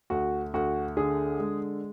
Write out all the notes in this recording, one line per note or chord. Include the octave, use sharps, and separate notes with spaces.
D2 F#4
D2 F#4
D3 G#4
G#3